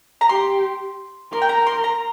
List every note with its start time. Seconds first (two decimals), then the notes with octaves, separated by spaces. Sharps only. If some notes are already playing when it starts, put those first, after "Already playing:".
0.21 A#5
0.29 G4 C6
1.33 A#4 C6
1.42 G5
1.49 A#5
1.67 C6
1.84 A#5